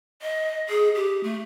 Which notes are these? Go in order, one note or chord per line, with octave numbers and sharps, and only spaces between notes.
D#5
G#4
G4
A3